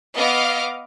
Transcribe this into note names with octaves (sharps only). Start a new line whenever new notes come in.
B3 D#5 F5 D6 F6